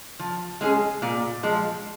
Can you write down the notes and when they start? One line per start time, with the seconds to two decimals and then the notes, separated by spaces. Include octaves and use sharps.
0.19 F3
0.61 G#3 C#4 G#4
1.02 A#2
1.43 F3 G#3